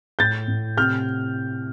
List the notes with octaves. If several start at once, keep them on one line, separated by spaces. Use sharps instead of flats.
A2 G6 A6
A2
C3 F6 G6